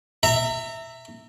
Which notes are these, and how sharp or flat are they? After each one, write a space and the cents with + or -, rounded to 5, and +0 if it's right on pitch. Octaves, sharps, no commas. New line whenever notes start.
E5 +0 A#5 -30